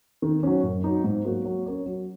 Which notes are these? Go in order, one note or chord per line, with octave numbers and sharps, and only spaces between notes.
D#3
F#3 C#4
F#2
F#3 D#4
G#2
F#3 A#3 F#4
F#3
C#4 A#4 C#5
F#3